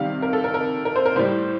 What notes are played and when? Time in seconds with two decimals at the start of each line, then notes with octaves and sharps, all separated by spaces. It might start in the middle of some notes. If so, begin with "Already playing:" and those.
Already playing: C3 D#3 G3 F5
0.22 A#4
0.33 A4
0.44 A#4
0.54 A#4
0.85 A#4
0.96 C5
1.06 A#4
1.16 A2 G3 C5